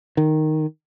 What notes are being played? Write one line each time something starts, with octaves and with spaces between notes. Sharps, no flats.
D#3